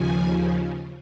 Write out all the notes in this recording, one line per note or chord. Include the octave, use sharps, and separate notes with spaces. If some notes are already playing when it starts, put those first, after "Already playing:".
Already playing: D#2 C#3 F3 G#5